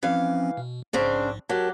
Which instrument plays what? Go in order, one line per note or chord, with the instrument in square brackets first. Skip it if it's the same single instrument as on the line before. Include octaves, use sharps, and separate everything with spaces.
[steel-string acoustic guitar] E3 F5 [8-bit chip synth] F3 C4 C#4
[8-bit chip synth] B2
[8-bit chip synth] A#1 G#2 [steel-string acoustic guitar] C#3 C4 D4
[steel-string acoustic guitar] F#3 G4 [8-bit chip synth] F#4 A#4 A5